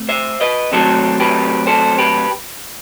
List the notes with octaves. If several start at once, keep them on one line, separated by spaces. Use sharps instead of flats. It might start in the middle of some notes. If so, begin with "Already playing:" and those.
Already playing: C3 A3 C4
C5 E5
B4 D#5
C3 D#3 F#3 A3 C4 A4 C5
G4 B4
A4 C5
G4 B4